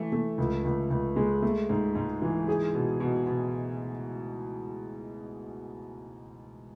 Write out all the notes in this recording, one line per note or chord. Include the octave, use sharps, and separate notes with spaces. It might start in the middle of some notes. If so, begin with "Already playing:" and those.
Already playing: E3 A3
A3
C#2
C#2
C#2
G#3
A3
G#2
G#2
E3
G#4
B2
B2
B2